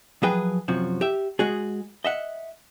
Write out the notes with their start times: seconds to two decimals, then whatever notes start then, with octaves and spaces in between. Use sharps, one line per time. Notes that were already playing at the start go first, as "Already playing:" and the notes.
0.23 F3 F#3 G#4 B4 G5
0.68 F#2 C3 F3 F#4
1.01 G4 E5
1.39 G#3 F#4 G#4
2.04 D#5 E5 F#5